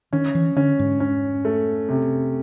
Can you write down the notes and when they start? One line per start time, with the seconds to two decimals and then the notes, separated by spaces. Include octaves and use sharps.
0.13 D#3 C#4
0.35 E3
0.56 D3 C#4
0.79 G#2
1.00 C#4
1.45 A3
1.89 C3